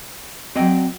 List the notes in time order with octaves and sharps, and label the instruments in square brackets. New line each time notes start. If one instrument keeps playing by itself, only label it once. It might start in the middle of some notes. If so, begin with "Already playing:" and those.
[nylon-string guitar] F#3 D5 [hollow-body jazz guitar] C4 D#5 G5